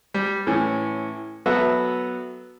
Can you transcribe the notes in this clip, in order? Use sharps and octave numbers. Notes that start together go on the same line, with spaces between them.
G3
A2 E3 C#4
F#3 B3 F#4 A4 B4 E5